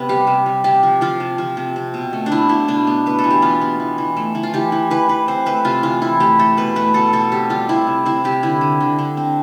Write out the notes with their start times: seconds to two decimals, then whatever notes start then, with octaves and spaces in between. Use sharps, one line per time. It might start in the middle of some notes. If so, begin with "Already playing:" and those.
Already playing: C3 B3 B4
0.09 G3 G4
0.27 C3
0.46 G3
0.64 C3 G4
0.83 F3
1.01 F3 F4
1.20 C3
1.38 F3
1.57 C3
1.76 C4
1.94 B2
2.13 A3
2.26 D4
2.31 B2 E4
2.49 B2 E4
2.68 B2 D4
2.87 B3
3.06 B3 B4
3.19 A4
3.24 E3
3.30 G4
3.42 B3 F4
3.61 B3
3.80 E3
3.98 E3
4.17 A3
4.35 E3
4.43 F4
4.54 E3 G4
4.72 E3
4.91 E3 B4
5.09 E3 B4
5.28 C4 C5
5.46 A3 B4
5.65 C3 F4
5.83 E3 F4
6.02 E3 E4
6.20 A3 G4
6.39 A3 A4
6.57 B2 B4
6.76 A3 B4
6.94 B2 A4
7.13 B2 A4
7.32 C4 G4
7.50 G3 F4
7.69 C4 E4
7.87 C3
8.06 C4 E4
8.24 C3 G4
8.43 D3 E4
8.61 D3
8.81 D3
8.99 D3
9.17 C4